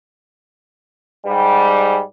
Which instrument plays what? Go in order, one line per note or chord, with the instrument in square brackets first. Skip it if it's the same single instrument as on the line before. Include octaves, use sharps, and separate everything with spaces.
[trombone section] G#2 G3